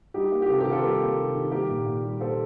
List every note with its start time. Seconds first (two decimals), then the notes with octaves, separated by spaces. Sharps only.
0.14 G3 D#4 G4
0.32 A#3
0.42 G4
0.48 C3 F4 A4
0.60 G4 A#4
0.66 D#3
0.71 F4 A4
0.83 G3 G4 A#4
1.01 A#3
1.17 C3
1.35 D#3
1.52 A#3 G4 A#4
1.69 A#2
1.86 A#2
2.04 G3
2.21 A#3 A4 C5